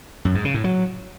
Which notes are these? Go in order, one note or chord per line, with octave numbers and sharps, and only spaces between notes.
F#2
G#2
C#3
A2
F#3